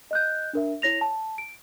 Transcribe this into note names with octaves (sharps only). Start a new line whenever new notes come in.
D#5 F#6 G6
D4 A#4 E5
E4 C#5 A#6 F7
A5
D7